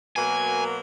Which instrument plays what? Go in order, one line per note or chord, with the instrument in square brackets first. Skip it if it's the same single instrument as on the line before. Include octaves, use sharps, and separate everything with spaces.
[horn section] B2 F#3 A#3 [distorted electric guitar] G#5